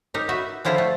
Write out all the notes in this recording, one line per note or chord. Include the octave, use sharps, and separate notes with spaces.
D#4 G4 A#4
F#4 B4 E5
D3 F3 E4 F4 C5 A#5
A3